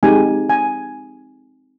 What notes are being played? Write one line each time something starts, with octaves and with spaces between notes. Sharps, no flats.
G#3 C4 D#4 G4 G#5
G#5